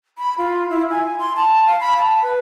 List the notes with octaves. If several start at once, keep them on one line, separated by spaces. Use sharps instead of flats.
B5
F4
E4
G#5
C6
A5
F5
B5
A5
B4